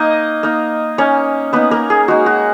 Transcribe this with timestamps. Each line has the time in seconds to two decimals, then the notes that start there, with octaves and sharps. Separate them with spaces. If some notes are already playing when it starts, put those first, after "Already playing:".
Already playing: A#3 D#4 D#5
0.43 A#3 D#4
0.98 A#3 C#4 D#4 C#5
1.53 A#3 B3 D#4 B4
1.71 A#3 A#4
1.90 G#4
2.08 G#3 D#4 F#4
2.26 F#4